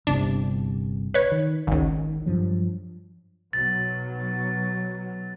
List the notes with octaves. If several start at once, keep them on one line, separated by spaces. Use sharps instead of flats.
G1 C2 C3 D4
B4 C#5
D#3
G#1 C#2 D#3
G2 F3 F#3
B1 F#3 A6